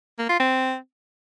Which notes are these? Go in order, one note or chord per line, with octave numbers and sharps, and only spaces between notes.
A#3
F4
C4